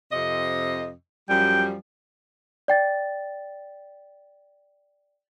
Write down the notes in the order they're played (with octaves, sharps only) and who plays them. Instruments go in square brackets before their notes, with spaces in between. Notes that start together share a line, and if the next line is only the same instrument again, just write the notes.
[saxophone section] F2 C3 D#5
[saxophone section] F#2 F3 G3 [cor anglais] G5
[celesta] D5 G5 A6